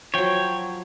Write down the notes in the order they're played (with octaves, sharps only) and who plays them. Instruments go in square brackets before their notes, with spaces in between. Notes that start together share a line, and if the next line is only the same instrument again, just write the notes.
[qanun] F3 F#3 [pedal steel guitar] C#5 G5